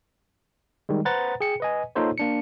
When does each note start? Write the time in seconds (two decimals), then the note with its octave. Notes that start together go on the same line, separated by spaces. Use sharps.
0.89 D#3 G3 G#3
1.05 B4 C5 F#5 A#5 A6
1.41 G#4 G5 C#7
1.60 B4 D#5 G#5
1.95 A#3 D#4 F4 A4 C5 C#5
2.18 A#3 D4 C#7